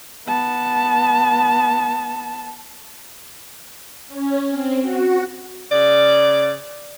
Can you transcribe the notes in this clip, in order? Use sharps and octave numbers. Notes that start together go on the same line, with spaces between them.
B3 A5
C#4
C4
F#4
C#3 D5